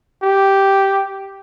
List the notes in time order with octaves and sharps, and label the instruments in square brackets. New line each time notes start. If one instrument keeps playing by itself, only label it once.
[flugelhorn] G4